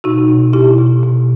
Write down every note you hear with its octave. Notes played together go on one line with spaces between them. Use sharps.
B2 D#4 F#4
B2
B2 E4 G4
B2
B2